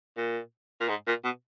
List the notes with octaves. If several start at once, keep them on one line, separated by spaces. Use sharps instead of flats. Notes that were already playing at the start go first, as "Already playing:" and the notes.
A#2
A#2
G#2
A#2
B2